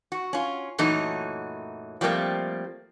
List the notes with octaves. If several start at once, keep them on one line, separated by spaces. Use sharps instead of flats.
F#4
C#4 F4
F#2 A#2 E3 F#3 A3 D#4
F3 G3 A3 A#3 C4